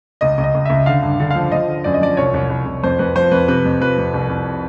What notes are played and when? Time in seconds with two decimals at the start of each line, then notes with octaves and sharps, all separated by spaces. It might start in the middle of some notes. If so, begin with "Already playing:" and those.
0.21 C#2 D#5
0.38 C#2
0.44 D#5
0.55 C#2
0.66 C#2 E5
0.86 D3 F5
1.03 G2
1.20 D3
1.31 F3 F5
1.52 F3 D#5
1.68 D3
1.84 F#2 D5
1.94 D#5
2.01 F3 D5
2.17 C2 C#5
2.34 C2
2.50 C2
2.66 C2
2.83 F2 C5
2.99 F2 B4
3.16 F3 C5
3.31 F2 B4
3.48 C3 B4
3.65 F2
3.81 F3 B4
3.98 F2
4.14 C2
4.29 C2